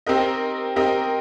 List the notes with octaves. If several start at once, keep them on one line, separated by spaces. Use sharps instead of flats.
C4 G4 A#4 D#5
C4 G4 A#4 D#5